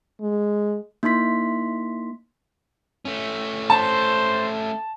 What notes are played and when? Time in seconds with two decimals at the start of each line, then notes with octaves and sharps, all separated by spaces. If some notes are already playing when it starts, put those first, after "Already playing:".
0.21 G#3
1.03 A#3 D#4 E4 C6 B6
3.05 A3 C#4
3.70 C5 A5